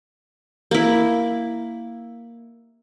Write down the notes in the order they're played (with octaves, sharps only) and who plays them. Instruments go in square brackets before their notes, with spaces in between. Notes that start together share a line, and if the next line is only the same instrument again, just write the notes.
[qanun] A#3 E4